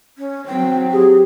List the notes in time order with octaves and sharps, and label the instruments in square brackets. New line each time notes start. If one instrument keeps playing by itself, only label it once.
[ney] C#4
[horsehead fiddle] F#3 C4 [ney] G5
[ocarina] G4 [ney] G#4